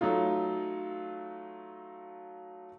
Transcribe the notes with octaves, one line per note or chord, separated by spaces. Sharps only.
F#3 A3 D#4 F4